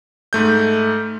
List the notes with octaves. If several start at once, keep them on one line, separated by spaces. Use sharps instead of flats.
G#2 A3 G6